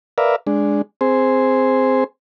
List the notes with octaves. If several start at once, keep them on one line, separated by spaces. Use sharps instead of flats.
A#4 B4 D5 E5 F5
G#3 D4
C4 G#4 C5